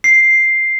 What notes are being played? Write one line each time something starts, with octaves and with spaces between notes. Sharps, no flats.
C7